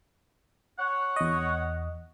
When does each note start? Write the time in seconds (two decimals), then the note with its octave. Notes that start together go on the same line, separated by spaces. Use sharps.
0.79 C#5 F#5
1.16 E2 D#5